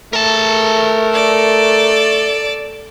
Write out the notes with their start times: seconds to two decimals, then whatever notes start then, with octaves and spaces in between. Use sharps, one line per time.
0.13 A3 A#4 A5
1.11 A4 D5